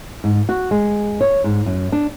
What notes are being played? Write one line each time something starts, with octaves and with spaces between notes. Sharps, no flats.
G#2
F#4
G#3
C#5
G#2
F#2
D4